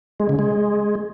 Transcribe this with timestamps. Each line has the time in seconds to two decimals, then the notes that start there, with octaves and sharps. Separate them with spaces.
0.20 G#3
0.29 C#3
0.39 G#3